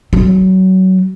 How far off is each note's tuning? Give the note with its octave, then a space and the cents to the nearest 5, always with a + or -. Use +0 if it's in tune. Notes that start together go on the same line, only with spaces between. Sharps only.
F#3 +20